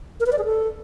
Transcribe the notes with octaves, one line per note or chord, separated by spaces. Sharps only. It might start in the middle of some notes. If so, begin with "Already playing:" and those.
A#4
B4
D5
G#4
A4